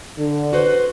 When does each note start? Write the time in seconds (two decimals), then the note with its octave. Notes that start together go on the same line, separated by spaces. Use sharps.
0.18 D3
0.53 F#4 B4 C5